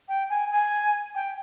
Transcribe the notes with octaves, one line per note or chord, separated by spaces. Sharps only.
G5
G#5
G#5
G5